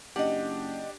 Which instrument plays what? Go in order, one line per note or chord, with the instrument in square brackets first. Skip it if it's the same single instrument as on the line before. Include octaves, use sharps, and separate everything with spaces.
[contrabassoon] F#1 [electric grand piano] D4 G4 [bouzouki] D#5 F#5